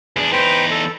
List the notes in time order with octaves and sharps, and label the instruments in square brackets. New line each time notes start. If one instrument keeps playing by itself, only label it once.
[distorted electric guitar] E2 D4 [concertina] G#4
[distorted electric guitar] E2 D#4 [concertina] B4 C5 G5
[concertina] A4